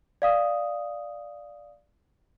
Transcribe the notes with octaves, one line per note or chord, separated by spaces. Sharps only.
D5 F5 D#6